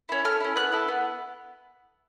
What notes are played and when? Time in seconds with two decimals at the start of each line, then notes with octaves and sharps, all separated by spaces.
0.09 C#4 E4
0.24 A3 F6
0.40 C#4 E4
0.56 B3 F#6
0.72 E4 A4
0.88 B3